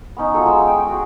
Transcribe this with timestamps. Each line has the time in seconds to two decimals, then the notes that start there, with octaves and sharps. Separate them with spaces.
0.17 B3 C#4 D#4
0.34 F3 F#3 A4
0.46 G#3 E6
0.68 G5
0.88 F#4 G#4